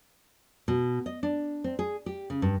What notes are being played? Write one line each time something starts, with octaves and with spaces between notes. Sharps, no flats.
B2
D#5
D4
C4
G#4
G4
C#3
G2